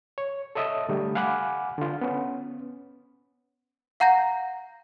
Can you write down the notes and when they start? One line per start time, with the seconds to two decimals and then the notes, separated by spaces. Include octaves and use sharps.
0.18 C#5
0.55 A4 C#5 D#5 E5 A5 D#6
0.89 D3 G3 A3
1.15 F5 F#5 G#5 B5 D6 F#6
1.78 D3 F4
2.01 B3 C#4
4.00 F5 F#5 A#5 G6 A#6